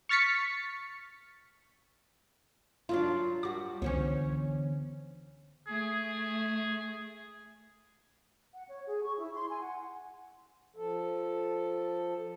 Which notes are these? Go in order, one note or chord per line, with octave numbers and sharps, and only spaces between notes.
C#6 F6 A6 B6 C#7
D#3 F#3 D4 F4
G3 F#4 D6
C#2 D3 E3 B3 C#4 C5 C#5
A3 G#4
F#5
C#5
G#4
C#6
E4
C6
G#5
F#5
F3 A4